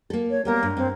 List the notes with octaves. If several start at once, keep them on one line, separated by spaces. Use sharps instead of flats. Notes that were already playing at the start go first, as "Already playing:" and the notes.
A#3 A4
C#5
G3 A#3 B3 A#4
G2
G2 C4